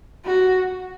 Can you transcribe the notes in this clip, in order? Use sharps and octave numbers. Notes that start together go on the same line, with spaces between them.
F#4